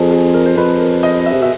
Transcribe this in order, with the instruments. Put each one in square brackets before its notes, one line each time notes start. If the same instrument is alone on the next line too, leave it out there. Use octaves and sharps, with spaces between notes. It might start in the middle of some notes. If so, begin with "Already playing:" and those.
Already playing: [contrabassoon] F2 [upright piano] G#4 A4
[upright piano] G#4
A#4
C5
[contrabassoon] F2 [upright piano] B4
[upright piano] A#4
D#5
E5
[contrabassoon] C3
[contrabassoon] B2 [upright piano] E5